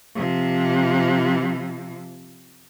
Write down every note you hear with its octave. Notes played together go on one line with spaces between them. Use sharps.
C3 F3